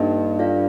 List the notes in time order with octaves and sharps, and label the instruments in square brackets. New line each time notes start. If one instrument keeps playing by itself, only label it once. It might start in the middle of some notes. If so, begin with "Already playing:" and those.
Already playing: [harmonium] G2 [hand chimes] A#3 D#4 A4 D#5
[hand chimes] F4 A4 D5 F5